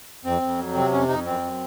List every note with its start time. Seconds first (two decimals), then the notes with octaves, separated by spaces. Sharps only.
0.25 F2 C4
0.42 F2
0.59 F#3
0.75 C3 C4
0.92 F2 C#4
1.08 F2 D#4
1.25 F#2 C4
1.42 F#2